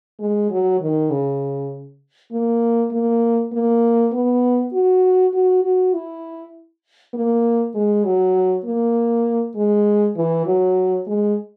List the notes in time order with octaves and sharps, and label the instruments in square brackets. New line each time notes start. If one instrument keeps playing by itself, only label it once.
[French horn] G#3
F#3
D#3
C#3
A#3
A#3
A#3
B3
F#4
F#4
F#4
E4
A#3
G#3
F#3
A#3
G#3
E3
F#3
G#3